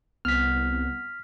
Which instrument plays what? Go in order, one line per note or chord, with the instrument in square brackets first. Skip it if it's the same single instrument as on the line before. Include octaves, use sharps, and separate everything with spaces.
[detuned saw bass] C2 [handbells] B3 [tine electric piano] F6 B6